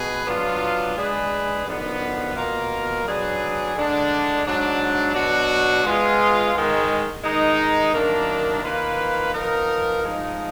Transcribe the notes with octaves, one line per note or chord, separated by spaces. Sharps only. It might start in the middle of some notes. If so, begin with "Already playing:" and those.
Already playing: B2 G#4 B4
F#3 B3 D4 F4
G#3 D4 G#4 B4
F#2 D3 F3 B3 D#4
B2 A#3 F4 A#4
F#3 D4 G#4 B4
D3 G#3 D4
G#2 F#3 D4
B2 F#3 D4 F#4
G#3 B3 F4 G#4
G#2 D#3 G#3
D#3 G#3 D#4
F#2 D#3 A#3 D4
D#3 A#3 F4 B4
F3 B3 D#4 A#4
F3 G#3 D#4